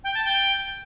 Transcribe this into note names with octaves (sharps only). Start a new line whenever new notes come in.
G5
A5
G5